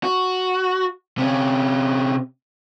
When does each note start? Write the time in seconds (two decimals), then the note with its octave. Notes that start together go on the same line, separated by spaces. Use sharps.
0.03 F#4
1.18 C3 C#4